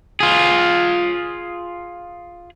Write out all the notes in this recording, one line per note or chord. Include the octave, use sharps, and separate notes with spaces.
F4 G#4